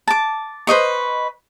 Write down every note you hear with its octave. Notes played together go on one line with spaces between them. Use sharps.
A5 D6
B4 C5 D#5 C#6